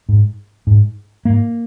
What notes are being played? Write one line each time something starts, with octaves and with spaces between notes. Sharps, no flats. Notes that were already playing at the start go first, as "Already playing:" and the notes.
G#2
G#2
G#2 A#3